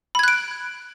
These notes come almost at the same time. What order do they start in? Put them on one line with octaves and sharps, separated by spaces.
B5 G#6 F#6 D7